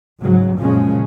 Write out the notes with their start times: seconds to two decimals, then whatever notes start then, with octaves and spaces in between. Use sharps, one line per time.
0.23 G#2 C#3 F#3
0.60 F#2 A#2 C#3 F3 G#3 C#4